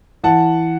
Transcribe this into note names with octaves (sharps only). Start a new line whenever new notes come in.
E3 F#5 A5